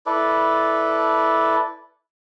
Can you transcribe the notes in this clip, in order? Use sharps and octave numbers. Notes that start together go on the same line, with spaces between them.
E4 A4 B4 D5